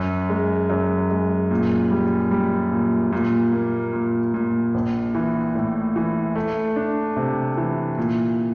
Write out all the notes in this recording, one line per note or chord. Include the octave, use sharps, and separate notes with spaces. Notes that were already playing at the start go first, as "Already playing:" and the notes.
Already playing: F#2
G#3
F#2
G#3
A#2
G3
G3
A#2
A#2
A#3
A#2
A#2
A#1
E3
A2
E3
A3
D4
C3
E3
A#2